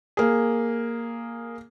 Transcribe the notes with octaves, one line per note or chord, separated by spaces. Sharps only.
A#3 G#4